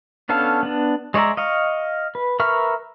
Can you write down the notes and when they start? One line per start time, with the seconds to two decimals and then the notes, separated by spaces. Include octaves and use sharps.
0.29 B3 C#4 D4 A4 F5
0.63 B3 D4
1.14 G#3 C#5 D5 E5 A#5
1.37 D#5 F5 C#6
2.15 B4
2.40 A#4 B4 E5 C#6 F6